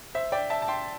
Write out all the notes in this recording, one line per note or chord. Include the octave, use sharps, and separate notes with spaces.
C5 E5
D5 G5
E5 A5
A5
G5 C6